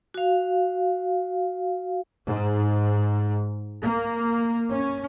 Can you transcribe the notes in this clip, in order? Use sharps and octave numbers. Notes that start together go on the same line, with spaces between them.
F#4 F5
G#2
A#3
C#4